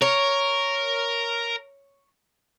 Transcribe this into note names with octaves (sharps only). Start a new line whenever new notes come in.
A#4 C#5